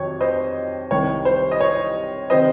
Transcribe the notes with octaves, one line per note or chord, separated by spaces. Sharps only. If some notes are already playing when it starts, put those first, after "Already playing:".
Already playing: F2 C3 D#3 F#3 C#5
C5 D#5
C2 C3 D#3 C#5
C5
D#5
C#5
C3 D#3 C5 D#5